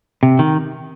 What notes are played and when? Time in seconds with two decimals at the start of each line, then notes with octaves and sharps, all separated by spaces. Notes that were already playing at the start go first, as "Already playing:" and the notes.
0.23 C3
0.39 D#3